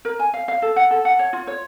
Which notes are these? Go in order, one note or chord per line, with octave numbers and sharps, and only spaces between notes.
A#4
G#5
F5
F5
A4
F#5
A4
F#5
C#5
F4
C#5